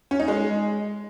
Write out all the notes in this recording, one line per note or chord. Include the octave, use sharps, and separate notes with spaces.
C#4
D#4
G#3